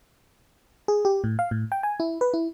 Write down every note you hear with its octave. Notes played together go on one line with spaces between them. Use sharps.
G#4
G4
A2
F5
A2
G5
G#5
E4
B4
E4